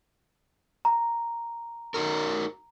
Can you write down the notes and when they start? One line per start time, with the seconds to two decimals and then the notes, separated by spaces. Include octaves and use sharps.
0.85 A#5
1.94 D#4 F#4 A#4